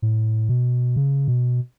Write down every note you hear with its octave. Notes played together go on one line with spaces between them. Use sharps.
A2
B2
C#3
B2